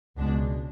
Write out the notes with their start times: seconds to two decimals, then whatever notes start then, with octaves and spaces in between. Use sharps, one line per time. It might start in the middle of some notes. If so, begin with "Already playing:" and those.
0.16 C#2 B2 G#3 D4